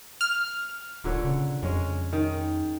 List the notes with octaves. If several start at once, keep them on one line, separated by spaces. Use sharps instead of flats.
F6
D1 A#2 D3 C#5
C#3
F2 G#3 C#4
D#3